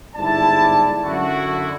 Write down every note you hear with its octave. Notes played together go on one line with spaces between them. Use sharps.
G1 G#2 E4 D5 A5
F#2 D3 E4 F#4